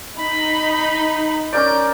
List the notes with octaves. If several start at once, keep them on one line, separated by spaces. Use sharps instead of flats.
D#4 B5
C#4 A#4 D5 G6